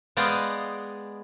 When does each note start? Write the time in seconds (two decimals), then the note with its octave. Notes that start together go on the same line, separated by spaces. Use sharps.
0.17 G#3 B3 D5 D#5 F5 G5